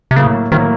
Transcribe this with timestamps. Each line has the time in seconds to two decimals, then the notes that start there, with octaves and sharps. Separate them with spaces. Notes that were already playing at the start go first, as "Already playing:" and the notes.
0.11 C3
0.16 A2 C#3 F#3 A#3
0.52 A2 D#3 F#3 A#3